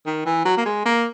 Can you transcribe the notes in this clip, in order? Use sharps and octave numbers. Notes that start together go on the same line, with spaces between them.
D#3
E3
F#3
A#3
G#3
A#3